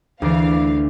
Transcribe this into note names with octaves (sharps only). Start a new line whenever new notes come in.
D2 E3 D5 F5